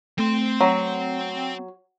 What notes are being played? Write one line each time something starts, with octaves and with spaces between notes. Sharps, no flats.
A3 C4 C6
F#3